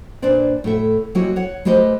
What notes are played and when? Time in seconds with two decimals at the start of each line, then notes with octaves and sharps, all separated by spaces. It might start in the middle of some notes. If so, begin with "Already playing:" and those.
0.22 A#2 D4 B4 C5 D5
0.64 A2 A4 E5
1.15 F#3 G#3 A#3 E4 F#4 G4
1.36 C#5 F#5
1.65 G#3 A3 G4 B4 C5 D#5